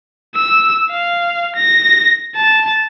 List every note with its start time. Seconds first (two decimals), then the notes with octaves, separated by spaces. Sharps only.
0.36 E6
0.91 F5
1.56 A#6
2.36 A5